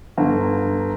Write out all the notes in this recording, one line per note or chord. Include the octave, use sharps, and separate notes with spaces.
G1